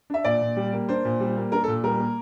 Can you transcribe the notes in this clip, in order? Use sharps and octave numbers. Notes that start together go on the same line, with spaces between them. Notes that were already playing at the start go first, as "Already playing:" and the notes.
D4 E5
A#2 D5
A#2
G3
A#3
D4 C5
A#2
G3
A#3
D4 A#4
A4
A#2
G3 A#4
A#3